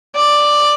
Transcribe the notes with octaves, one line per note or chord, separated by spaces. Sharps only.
D5